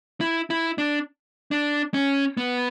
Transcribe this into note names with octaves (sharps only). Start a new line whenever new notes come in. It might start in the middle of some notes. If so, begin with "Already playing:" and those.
E4
E4
D4
D4
C#4
B3